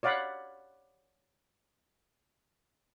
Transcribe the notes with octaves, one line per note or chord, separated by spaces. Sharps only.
C#5 D5 F5 F#5 B5